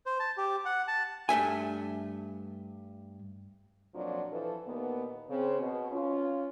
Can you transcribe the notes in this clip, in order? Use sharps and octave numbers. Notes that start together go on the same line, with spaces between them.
C5
A5
G4
F#5
A5
G2 A3 E5 G#5
F2 A#2 F3 F#3 D4
E3 F3 A4 B4
D#2 A#2 A#3 B3
C#3 C4
B2
C#4 F4